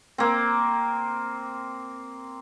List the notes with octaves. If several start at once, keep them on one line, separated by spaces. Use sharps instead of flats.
A#3 C4